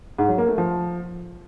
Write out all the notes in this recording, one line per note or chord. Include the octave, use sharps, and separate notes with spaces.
G#2
F#3
A#3
A3
F3